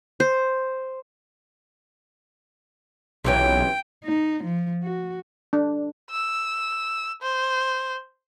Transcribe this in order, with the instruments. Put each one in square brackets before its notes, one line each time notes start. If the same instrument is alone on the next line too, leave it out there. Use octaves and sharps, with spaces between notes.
[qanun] C5
[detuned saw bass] B1 [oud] C3 E3 C#4 [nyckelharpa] G5
[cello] D#4
F3
F#4
[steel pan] D4
[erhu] E6
C5